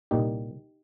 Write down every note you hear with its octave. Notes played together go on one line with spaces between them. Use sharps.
C2 A#2 D#4 G4